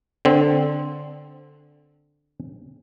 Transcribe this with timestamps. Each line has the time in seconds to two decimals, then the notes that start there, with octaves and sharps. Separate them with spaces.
0.25 D3 C4